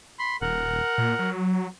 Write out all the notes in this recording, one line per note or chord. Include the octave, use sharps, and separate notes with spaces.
B5 C6
D#1 A#4 F#5
A#2
F#3